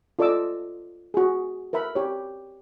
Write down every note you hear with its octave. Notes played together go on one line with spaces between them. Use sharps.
F4 A4 D5 D#5 D6 E6
F#4 G#4
A#4 B4 E5 B5
G4 C#5